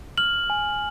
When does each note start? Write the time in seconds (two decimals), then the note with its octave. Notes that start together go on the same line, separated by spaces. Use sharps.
0.18 F6 F#7
0.50 G#5